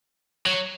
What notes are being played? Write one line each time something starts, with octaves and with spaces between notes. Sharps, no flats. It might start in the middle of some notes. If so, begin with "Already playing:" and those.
F#3